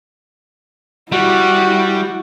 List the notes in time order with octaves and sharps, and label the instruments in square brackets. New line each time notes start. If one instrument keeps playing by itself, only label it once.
[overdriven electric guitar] G3 [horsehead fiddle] E4 [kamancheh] F#4